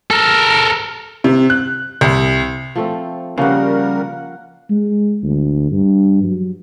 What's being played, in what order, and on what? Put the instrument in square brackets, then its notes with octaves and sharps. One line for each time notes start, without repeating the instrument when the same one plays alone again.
[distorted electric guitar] A4 A#4
[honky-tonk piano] C3
F#6
C2
[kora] F3 A3 C4
[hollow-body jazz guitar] C#3 [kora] F3 A#3 C#4 [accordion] G3 A#4 [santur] F5 F#5
[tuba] G#3
D2
G2
F#3